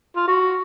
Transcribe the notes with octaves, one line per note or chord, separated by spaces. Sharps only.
F4
F#4